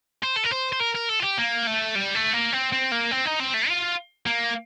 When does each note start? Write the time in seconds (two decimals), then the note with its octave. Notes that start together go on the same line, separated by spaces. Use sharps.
0.23 C5
0.36 A4
0.44 A#4
0.52 C5
0.72 C5
0.80 A#4
0.95 A#4
1.09 A4
1.20 F4
1.23 G4
1.38 A#3
1.67 A3
1.95 G3
2.15 A3
2.34 A#3
2.53 C4
2.72 C4
2.92 A#3
3.11 C4
3.25 D#4
3.40 C4
3.54 A3
3.68 F4
4.26 A#3